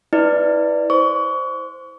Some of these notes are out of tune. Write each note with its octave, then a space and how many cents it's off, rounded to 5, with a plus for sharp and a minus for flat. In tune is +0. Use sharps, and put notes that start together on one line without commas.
E4 -25 B4 +0 D5 +0
C5 +0 C#6 +35